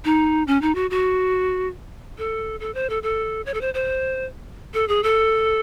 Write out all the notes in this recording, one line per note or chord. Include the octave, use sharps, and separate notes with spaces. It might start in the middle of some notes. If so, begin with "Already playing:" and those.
D#4
C#4
D#4
F#4
F#4
A4
A4
C5
A4
A4
C#5
A4
C5
C5
A4
G#4
A4